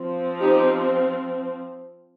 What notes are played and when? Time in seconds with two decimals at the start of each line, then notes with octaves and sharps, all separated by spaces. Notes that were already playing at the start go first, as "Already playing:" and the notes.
Already playing: F3 C4
0.40 D#4 G4